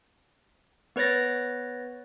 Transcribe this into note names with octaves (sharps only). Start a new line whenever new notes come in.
B3 B4 C#5 A6 A#6